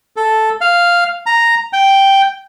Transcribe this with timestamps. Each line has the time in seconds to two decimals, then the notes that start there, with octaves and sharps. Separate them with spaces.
0.16 A4
0.61 F5
1.26 A#5
1.73 G5